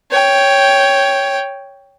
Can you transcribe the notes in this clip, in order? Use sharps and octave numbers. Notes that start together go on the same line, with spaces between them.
C#5 G5